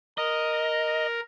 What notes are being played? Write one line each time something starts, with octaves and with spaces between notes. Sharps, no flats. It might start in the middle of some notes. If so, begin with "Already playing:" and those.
A#4 D#5